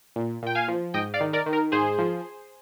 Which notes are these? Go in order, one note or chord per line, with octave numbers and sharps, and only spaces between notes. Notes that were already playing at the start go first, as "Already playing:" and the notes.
A#2
A#2 G5
F5 G#5
F3
G#2 D#5 G5
D5 F5
D#3
A#4 D5
D#3
A#4
G#2 G#4 C5
F3